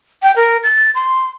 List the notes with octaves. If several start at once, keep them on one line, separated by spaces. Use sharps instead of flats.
G5
A#4
A6
C6